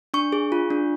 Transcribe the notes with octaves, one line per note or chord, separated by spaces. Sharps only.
D4 C#6
G#4
F4
D4